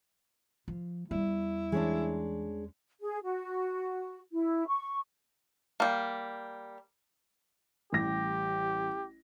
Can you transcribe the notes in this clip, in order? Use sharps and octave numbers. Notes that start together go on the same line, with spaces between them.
F3
E2 G3 E4
E3 G#3 C#4 D4
G#4
F#4
E4
C#6
G3 A#3
A1 G3 G4 A#6